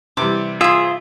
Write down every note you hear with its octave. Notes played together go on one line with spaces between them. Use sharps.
C3 E3 G3 D6
F4 G#4 C5 E5